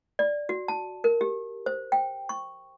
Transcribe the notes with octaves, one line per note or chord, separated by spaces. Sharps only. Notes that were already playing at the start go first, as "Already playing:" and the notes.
D5
F#4
A5
A#4
G4
C5
G5
C#6